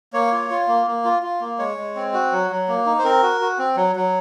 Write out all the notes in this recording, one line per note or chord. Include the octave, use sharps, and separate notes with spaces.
A#3 C#5
F4
F4
A#3
A#3
F4
F4
A#3
G#3 C#5
G#3
C4
F#4
F#3
F#3
A#3
D#4
C5
C4 A#4
F#4
F#4
C4
F#3
F#3